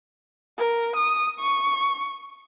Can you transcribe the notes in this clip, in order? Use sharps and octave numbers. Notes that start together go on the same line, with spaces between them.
A#4
D#6
C#6